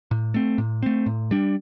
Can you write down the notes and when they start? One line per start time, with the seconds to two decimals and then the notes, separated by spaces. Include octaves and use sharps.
0.11 A2
0.34 A3 C4
0.58 A2
0.83 A3 C4
1.06 A2
1.31 G3 D4